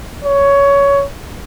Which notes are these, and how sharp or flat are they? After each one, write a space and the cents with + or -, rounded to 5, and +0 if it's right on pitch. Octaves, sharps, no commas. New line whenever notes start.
C#5 +15